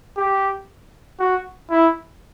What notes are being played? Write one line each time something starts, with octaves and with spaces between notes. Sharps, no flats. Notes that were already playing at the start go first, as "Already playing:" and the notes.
G4
F#4
E4